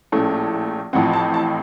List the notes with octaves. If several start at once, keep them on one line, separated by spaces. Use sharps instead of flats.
A#1 A2 A3 C#4
A1 A2 F3 C4 F#5
A5
A5